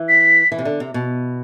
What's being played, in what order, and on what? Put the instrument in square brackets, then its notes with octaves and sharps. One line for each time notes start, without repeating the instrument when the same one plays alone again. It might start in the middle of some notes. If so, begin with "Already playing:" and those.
Already playing: [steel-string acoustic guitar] E3
[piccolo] B6
[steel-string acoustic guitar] E3
C3
D3
C3
B2